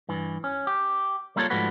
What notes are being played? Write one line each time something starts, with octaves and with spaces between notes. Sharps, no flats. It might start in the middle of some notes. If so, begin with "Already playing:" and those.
G2 E3
C#4
G4
G3 A#3 E4 F4 A4 C#5
G#2 F3 G3 A3 F#4 B4